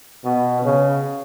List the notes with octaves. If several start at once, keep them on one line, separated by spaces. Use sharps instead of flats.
B2
C#3